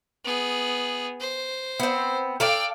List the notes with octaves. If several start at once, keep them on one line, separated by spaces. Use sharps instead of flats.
B3 G#4
C5
B3 C4
A4 D5 F5 G5